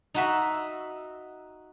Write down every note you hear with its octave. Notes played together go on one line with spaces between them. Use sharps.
D#4 F#4 E5